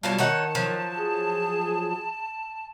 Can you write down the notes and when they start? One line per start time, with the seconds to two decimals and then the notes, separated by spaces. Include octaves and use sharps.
0.03 B2 F#3 G3 F4 A5
0.18 D#3 D#4 C#5 F#5
0.55 F3 F#3
0.98 G#4